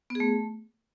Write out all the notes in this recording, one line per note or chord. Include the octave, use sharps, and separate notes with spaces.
B3
G#4
A3